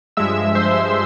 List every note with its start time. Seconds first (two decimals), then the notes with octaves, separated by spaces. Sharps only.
0.17 G2 F3 G#3 E5 E6
0.55 C5 C6